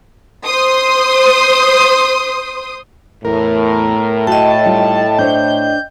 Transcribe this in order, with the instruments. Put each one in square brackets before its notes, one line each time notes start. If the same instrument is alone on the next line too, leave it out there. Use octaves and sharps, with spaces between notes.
[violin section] C5 C6 D#6
[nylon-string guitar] E2 [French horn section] A2 [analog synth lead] A#4
[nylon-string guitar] F#4 [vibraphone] D#5 G5 [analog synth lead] A5
[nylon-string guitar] G3 D#4 F4
[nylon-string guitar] D4 C5 C#5 [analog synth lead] G6